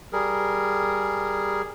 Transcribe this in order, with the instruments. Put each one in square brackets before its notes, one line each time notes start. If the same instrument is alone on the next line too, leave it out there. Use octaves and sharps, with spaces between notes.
[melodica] G3 G#4 A#4